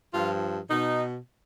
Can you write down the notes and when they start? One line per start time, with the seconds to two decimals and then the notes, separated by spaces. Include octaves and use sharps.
0.14 G2 F3 F4
0.70 B2 D#4